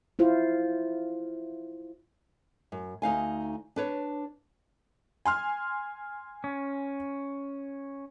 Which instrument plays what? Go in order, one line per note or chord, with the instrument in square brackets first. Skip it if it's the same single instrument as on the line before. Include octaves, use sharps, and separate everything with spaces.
[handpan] E4 F4 C5
[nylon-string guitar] F#2
D2 D#4 F5 G#5
D4 B4 C#5
[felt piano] G#5 C6 F6
[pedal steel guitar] C#4